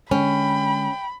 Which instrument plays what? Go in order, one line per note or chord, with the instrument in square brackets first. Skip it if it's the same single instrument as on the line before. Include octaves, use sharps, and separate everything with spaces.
[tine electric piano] D3 G#3 [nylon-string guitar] C#4 [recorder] G5 [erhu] B5